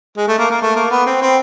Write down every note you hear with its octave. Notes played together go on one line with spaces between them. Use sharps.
G#3
A3
A#3
A#3
A3
A#3
B3
C4
C4